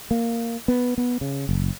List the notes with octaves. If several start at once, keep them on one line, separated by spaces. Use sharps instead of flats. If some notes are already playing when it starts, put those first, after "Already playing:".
A#3
B3
B3
C#3
F#1